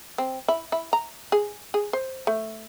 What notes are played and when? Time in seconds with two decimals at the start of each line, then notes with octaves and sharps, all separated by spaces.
0.18 C4
0.48 E4
0.72 E4
0.93 A#5
1.32 G#4
1.74 G#4
1.93 C5
2.27 A3